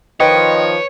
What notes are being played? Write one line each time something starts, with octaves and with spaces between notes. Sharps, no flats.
D#3 F3 B4 C#5 D#5 G5